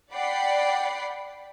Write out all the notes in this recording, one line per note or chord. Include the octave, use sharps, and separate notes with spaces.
D5 F#5 G5 B5 C7